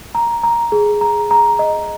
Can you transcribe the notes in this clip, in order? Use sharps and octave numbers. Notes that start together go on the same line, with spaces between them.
A#5
A#5
G#4
A#5
A#5
D#5